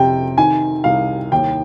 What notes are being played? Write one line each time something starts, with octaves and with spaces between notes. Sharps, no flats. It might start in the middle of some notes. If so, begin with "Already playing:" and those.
Already playing: F2 C3 G5
D#3 G#5
C2 F5
D#2 G5